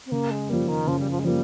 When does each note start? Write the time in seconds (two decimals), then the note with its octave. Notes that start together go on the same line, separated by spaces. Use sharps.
0.06 C4
0.11 C#3 A#3
0.30 G#3
0.49 F3 G3 A#3
0.68 D#3
0.87 C#3 F3
0.99 G3
1.10 F3
1.19 G#3
1.24 F3 G3 A#3